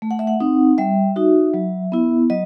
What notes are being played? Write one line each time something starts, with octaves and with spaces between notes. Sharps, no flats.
A3
F#5
E5
F#5
C4 D#4
G3 E5
D#4 F#4
F#3
B3 E4
F#3 D#5